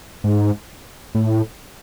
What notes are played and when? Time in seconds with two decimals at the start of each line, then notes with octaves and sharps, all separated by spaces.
0.24 G#2
1.15 A2